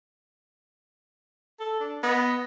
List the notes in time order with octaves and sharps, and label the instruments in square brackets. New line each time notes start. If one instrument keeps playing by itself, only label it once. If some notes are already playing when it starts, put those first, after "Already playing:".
[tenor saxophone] A4
D4
[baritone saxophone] B3 [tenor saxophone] D#5